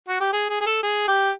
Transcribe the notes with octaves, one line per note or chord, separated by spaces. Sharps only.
F#4
G4
G#4
G#4
G#4
A4
G#4
G4